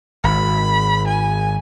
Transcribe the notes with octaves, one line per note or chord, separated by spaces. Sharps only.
G#1 B5
G#5